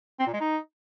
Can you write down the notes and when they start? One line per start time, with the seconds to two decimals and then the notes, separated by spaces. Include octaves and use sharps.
0.20 C4
0.27 A#2
0.33 G#3
0.40 D#4